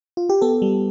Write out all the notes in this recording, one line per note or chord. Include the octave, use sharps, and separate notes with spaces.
F4
G4
B3 A4
G3